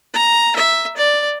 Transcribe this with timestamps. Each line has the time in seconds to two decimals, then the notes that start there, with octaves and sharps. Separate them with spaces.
0.14 A#5
0.56 E5
0.97 D5